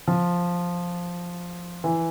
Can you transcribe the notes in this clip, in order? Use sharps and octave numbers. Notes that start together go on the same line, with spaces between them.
F3
E3